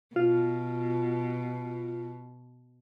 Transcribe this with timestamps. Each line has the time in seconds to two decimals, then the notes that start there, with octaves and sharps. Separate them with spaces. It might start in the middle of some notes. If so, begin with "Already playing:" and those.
0.16 B2 F4